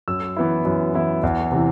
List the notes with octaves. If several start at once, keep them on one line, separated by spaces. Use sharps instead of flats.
F#2 E6
E3 B3 E4
F#2
E3 B3 E4
E2
C3 E3